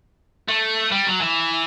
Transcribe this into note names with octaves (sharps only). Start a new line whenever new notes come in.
A3
G3
F#3
E3